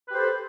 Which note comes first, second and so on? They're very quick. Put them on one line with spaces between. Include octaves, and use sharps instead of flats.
B4 G4 C5 A4